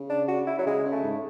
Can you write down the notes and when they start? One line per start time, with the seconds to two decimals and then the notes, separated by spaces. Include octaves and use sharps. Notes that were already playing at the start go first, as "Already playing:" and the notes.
Already playing: C#3
0.09 D4
0.28 F#4
0.47 E4
0.58 F#3
0.66 C#3 G#3
0.86 C#3
0.92 A3
1.03 G#2